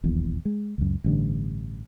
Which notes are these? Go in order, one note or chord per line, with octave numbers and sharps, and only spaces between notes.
D#1 A#1 E2
G#3
C#2 F#2
A1 G2 D3